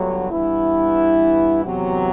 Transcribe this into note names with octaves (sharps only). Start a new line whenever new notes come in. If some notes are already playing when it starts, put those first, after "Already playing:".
Already playing: G1 G2 D3 F#3 A3
G2 E3 B3 E4
E2 C3 F#3